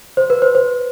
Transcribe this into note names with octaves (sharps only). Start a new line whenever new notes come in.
C5
B4
C5
C5